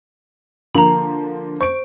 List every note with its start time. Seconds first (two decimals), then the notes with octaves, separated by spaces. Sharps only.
0.75 D3 F3 A#3 A#5 B5
1.61 C5 C#6 D7